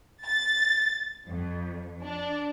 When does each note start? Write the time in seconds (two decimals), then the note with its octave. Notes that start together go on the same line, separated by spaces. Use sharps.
0.24 A6
1.26 F2
2.03 D4